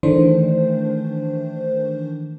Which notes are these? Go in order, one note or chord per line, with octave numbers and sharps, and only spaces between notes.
D#3 E3 A3 D4 C5